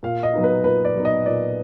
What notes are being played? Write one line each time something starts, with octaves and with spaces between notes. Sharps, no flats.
A#2 F5
D#5
F#3 B3 D#4
B4
A#2 B4
D5
F#3 B3 D#4
D#5
A#2 D5